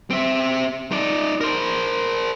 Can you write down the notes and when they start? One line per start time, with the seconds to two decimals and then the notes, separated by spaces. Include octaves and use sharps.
0.10 C4 E5
0.91 D#4 D5
1.41 A#4 C5